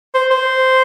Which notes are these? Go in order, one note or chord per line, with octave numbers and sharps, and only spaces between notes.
C5
C5